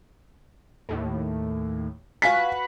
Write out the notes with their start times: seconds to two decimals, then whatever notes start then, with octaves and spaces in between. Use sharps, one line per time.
0.89 D#2 A2
2.22 F#4 B4 F5 G#5 F#6 B6